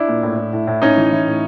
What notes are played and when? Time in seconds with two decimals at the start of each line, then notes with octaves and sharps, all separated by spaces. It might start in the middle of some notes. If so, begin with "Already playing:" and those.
Already playing: D4 E4
0.08 A#2
0.23 A2
0.38 A2
0.53 A2
0.67 A2
0.82 A2 C#4 D#4
0.97 E3
1.11 E3
1.27 A2